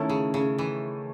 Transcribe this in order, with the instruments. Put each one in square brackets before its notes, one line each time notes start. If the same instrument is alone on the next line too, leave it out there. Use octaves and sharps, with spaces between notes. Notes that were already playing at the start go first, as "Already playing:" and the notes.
Already playing: [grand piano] D#3 A3 C#4 E4 A4
[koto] C#3
C#3
E3